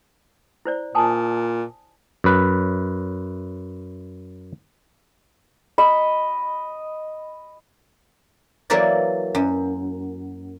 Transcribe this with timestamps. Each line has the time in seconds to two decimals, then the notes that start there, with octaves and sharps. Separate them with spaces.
0.66 E4 C5 D5
0.95 A#2 G#5 A5 D#6
2.24 F#2 B4
5.78 D#5 B5
8.70 E3 F#3 A#3 F#4 A#4 D5
9.35 F#2